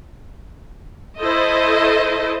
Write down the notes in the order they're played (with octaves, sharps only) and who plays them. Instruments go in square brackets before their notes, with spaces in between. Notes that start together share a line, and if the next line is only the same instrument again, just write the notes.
[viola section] E4 A4 C5 D#5